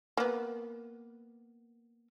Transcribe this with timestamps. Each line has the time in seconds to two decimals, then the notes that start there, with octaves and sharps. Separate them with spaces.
0.17 A#3 B3